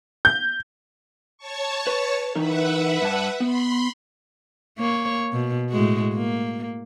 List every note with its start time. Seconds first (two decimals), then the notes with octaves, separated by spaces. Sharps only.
0.25 G6
1.38 C#5 A5 C#6
1.87 B4
2.35 E3 D#4 A#4 B4 E5 F#5
3.02 G2 A5
3.40 B3 B5 C6
4.78 A#3 C#5
5.33 B2
5.70 A2 G#3 F#4
6.15 A#3